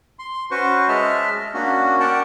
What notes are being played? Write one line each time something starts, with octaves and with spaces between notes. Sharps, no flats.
C6
C#4 F#4 B4 C5 C#6
G#3 D#5 E5 A5 F6
A#3 C#4 D4 F#4
A#4 D5 F#5 G5 A5